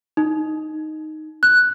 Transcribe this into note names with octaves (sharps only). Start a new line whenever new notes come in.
D#4
F#6